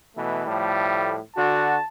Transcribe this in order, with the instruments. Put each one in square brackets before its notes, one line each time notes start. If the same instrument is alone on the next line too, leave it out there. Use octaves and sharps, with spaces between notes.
[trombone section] B2 E3 A3
[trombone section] A2 F3 A3 [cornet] G3
[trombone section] D3 F#4 [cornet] A5